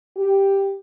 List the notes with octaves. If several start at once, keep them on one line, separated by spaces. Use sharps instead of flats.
G4